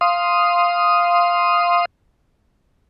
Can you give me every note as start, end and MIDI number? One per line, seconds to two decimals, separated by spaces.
0.01 1.85 77
0.01 1.85 84
0.01 1.85 87